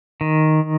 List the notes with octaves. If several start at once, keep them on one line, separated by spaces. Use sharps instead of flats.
D#3